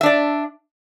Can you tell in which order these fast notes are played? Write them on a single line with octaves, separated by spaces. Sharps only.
E5 D4 D5